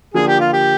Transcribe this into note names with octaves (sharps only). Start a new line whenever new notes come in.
D3 F3 A#3 G#4
G4
F4
G4